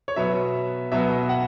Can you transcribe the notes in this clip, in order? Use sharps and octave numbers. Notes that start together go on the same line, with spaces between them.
C#5
B2 F#3 B3 E5
B2 F#3 B3 E5
F#5